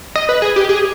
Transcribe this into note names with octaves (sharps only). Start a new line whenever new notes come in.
D#5
B4
G#4
G4
G#4